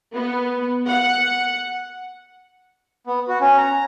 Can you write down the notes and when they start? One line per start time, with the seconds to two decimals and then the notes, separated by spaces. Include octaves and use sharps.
0.16 B3
0.90 F#5
3.07 B3
3.28 F#4
3.41 C#4
3.58 A#5